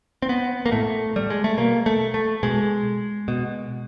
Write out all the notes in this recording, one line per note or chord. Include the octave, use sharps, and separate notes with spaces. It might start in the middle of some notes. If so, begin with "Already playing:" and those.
C4
B3
A#3
A2 A3
G3
G#3
A3
B2 A#3
A3
A3
B2 G#3
B2